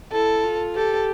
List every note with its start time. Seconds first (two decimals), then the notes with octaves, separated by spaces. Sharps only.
0.12 E4 A4
0.44 F4
0.75 G4 A4